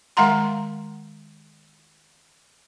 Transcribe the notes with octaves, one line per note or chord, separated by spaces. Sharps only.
D#3 G#3 F5 F#5 A#5 C6